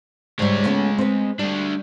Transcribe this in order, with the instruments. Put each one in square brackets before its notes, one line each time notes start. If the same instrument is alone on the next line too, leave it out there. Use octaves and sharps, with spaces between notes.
[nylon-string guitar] G#2 G3 [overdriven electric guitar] G#3 C#5
[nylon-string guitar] A3 B3 C#4
C4 B4
[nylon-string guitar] G3 [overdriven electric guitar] A3 D4